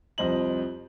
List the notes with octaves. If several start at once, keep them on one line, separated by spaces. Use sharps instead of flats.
C2 F2 C5 D#5 F#7